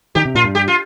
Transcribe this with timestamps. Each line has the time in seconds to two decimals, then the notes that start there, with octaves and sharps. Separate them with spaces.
0.15 D#3 G4
0.25 C3
0.35 A#2 F4
0.44 G2
0.55 G4
0.68 F4